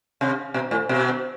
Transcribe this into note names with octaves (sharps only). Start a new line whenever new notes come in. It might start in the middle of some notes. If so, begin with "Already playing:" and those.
C3
B2
A2
B2